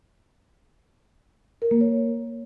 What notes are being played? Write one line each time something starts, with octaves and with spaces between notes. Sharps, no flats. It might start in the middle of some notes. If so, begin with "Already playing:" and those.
A#4
A#3
C#5